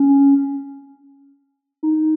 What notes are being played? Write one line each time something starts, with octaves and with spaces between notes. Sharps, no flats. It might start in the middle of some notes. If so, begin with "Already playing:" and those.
Already playing: C#4
D#4